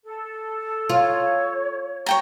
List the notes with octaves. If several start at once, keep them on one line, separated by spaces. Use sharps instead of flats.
A4
F4 C#5
C#5 G5 A#5